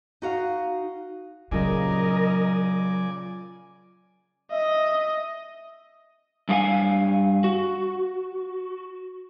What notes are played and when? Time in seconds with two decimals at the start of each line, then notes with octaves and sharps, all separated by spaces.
0.22 D#4 F#4 F5
1.51 A#2 C#3 F#3 A#4 D5 D#5 G#5
4.51 D#5 E5
6.49 G2 A3 G#4 F5 G#5
7.44 F#4